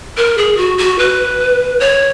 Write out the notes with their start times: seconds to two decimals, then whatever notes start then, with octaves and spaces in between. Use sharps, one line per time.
0.17 A#4
0.38 G#4
0.57 F#4
0.78 F#4
0.99 B4
1.80 C#5